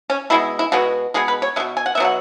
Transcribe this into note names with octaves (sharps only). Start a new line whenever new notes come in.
C#4
B2 G#3 B3 E4
E4
B2 G#3 B3 F#4
B2 G#3 B3 G#4
B4
C#5
B2 G#3 B3 E5
G#5
F#5
B3 E5
B2 F#3 F#5